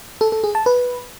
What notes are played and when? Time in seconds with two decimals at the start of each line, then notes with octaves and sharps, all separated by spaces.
0.21 A4
0.32 A4
0.44 G#4
0.55 A5
0.66 B4